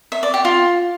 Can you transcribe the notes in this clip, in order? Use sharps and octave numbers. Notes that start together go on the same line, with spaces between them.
E5
D5
G4
F4